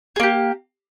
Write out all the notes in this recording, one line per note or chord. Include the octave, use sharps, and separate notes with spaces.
A#3 G4 G#4